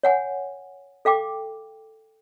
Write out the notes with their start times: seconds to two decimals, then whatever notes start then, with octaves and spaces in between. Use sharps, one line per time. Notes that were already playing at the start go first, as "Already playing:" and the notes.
0.03 C#5 F#5 G#5
1.05 A4 F5 G5 D6